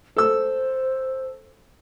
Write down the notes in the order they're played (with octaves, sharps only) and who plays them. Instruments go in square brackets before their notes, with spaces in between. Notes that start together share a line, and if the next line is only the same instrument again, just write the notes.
[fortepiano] A4 E6 [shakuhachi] C5